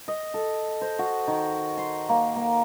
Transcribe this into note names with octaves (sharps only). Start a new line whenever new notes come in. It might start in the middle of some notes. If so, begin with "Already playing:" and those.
D#5
A4
C5
F#4
D#3
C6
A#3
A#3